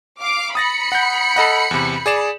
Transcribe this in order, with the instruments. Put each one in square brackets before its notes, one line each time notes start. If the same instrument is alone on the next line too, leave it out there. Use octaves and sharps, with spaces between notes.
[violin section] F5 D6
[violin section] B5 C#7 [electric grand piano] D#6 A6 A#6
[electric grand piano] F#5 G6
A4 D#5 F#5
E2 C3
G#4 D5 E7